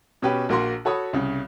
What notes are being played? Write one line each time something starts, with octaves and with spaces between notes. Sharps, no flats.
B2 C#4 G4 B4
A#1 A#3 F#4 C6
F#4 A4 C#5 B5 D#6
C2 C#3